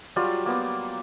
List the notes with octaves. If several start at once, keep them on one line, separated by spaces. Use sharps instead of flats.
F#3 G3 F4 D5
A#3 B3 D6